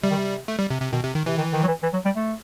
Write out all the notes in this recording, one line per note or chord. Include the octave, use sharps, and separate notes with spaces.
C3 G3
D#3
C3
A3
G3
C3
C3
B2 D#3
C3
D#3
C3 E3
D#3
D#3
F#3
E3
E3
F#3
G3
A3